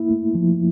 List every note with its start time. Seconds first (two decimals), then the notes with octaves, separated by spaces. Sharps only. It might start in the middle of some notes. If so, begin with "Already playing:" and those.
Already playing: A#3 E4
0.09 A3
0.35 F3